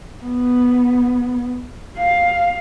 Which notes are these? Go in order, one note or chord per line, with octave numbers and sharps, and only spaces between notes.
B3
F5